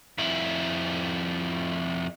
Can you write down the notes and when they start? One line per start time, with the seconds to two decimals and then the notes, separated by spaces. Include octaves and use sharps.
0.18 F2 E4